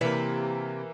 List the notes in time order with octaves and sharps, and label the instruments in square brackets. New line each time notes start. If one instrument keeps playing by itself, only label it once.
[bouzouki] C3 B4 E5 [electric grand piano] E3 A#3